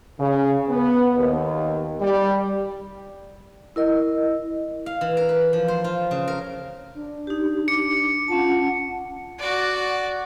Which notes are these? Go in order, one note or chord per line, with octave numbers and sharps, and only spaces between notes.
C#3
B3
D#2
G3
E4 A#4 D#5
F5
E3
A#4
B4
F3
C5
F4
C#3
A#4
D4
D#4 G4
D6 C#7
C#4 F4 F#5 A5
F#4 D5